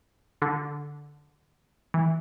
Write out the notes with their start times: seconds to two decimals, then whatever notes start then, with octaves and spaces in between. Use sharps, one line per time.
0.42 D3
1.94 E3